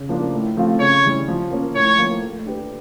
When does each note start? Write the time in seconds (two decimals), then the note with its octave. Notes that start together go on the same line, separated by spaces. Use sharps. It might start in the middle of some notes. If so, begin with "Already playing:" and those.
Already playing: C#3
0.09 F3 A#3 D4
0.33 A2
0.57 F3 A3 C4 F4
0.80 C#3 C#5
1.03 E3 G3
1.28 F3
1.51 A#3 C#4
1.75 A2 C#5
1.98 F3 A#3
2.23 A3
2.46 D4 G4 B4